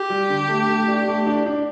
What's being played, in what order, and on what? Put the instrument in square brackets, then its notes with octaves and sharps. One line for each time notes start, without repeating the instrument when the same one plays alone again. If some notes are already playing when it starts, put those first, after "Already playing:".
Already playing: [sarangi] G4
[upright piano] G3
D3
A3
A3
D4
A3
D4
D4